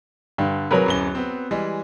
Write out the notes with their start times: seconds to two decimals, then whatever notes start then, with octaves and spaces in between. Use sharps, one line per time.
0.38 G2 D3
0.71 C2 F#3 G#4 A#4 B4 B5
0.86 D1 F#2 G7
1.15 B3 C4
1.51 E3 G3 G#3